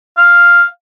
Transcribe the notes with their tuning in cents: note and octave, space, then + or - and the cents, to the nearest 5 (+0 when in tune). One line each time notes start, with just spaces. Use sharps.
F5 +0